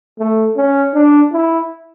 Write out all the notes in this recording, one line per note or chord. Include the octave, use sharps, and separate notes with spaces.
A3
C#4
D4
E4